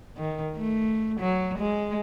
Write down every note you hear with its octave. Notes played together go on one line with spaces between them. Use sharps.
D#3
A3
F#3
G#3